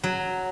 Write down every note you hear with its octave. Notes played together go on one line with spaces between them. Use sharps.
F#3